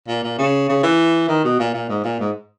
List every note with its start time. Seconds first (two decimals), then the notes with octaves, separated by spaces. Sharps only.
0.08 A#2
0.23 A#2
0.38 C#3
0.69 C#3
0.83 E3
1.28 D#3
1.44 B2
1.59 A#2
1.74 A#2
1.89 G#2
2.04 A#2
2.20 G#2